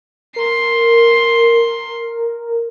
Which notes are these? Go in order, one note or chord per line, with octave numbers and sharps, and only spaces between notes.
A#4 C6